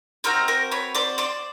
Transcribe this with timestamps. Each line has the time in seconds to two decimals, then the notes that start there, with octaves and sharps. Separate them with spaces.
0.24 C4 D#4 F#4 A#4 C5
0.48 A#4 C5
0.71 B4 C#5
0.95 C5 D5
1.18 C5 D5